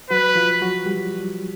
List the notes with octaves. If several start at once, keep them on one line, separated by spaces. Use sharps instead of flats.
F#3 F#4 B4
F3 F4
F#3 F#4
G3 G4